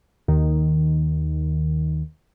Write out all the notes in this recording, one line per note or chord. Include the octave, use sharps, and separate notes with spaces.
D#2 D#3